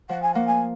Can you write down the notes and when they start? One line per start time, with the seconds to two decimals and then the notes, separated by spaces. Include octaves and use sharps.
0.09 F3 F#5
0.22 G#5
0.34 A#3 F#5
0.47 G#5